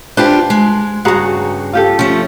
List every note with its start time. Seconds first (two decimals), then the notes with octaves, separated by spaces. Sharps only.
0.17 D4 F4 G4 B4 C5 A5
0.50 G#3
1.05 G2 C#3 F#4 G#4 A#5
1.73 F4 G4 A4
1.99 F3 A3 C#4